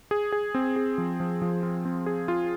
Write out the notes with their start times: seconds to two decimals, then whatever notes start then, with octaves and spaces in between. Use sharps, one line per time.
0.11 G#4
0.32 G#4
0.55 C4
0.76 G#4
0.98 F3
1.20 F3
1.42 F3
1.63 F4
1.85 C4
2.06 G#4
2.28 F4